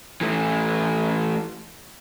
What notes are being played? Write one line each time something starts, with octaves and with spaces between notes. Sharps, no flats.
E3 A3